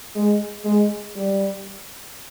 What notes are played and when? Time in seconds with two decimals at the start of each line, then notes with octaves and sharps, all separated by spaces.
0.16 G#3
0.65 G#3
1.16 G3